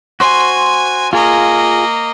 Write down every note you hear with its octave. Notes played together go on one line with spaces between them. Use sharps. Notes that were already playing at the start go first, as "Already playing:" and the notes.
F#4 C5 G#5 C6
A#3 F4 G#4 D#5